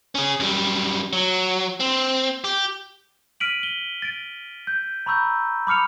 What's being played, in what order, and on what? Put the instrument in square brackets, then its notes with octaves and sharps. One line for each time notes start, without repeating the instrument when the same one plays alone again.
[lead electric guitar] C#4 G#4
F#2 G3
F#3
C4
G4
[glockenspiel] F6 B6 D7 D#7 F#7
G7
A6 D7
G6
A#5 B5 C#6 E6 G6
B5 D6 F6 C#7 F7